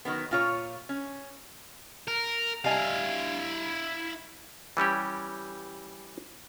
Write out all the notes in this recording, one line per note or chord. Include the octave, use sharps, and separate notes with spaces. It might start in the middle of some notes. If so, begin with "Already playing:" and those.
D#3 F#3 B3
A#2 F4 C#5
C#4
A#4
G3 E4 D#5 F5 G#5
E3 G3 C#4 G4